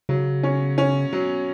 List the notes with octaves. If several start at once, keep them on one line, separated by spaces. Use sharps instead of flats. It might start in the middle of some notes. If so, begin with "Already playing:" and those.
C#3 F#3
C#4
C#4
F#3